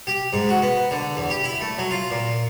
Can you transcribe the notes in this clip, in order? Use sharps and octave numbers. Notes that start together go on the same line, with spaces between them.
G4
G#2
F#4
B3
D3
E2
G4
E4
A3
F#3
F4
A#2